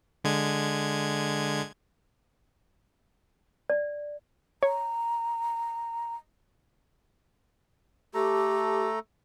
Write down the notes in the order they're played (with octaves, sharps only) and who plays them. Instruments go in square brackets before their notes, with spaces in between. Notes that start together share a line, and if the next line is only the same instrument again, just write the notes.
[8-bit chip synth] D3 G#3 G#6
[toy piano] D5
[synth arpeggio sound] C#5 [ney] A#5
[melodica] A3 A4 A#5 [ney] G4